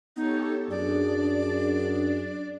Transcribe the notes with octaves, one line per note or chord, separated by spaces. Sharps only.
B3 D#4 G4 A4 C#5
F#2 D4 G#4 D5